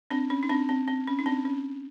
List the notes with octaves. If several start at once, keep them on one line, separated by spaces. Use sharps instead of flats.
C4 D4
C#4
D#4
C4 D4
C4
C4
C#4
D#4
C4 D4
C#4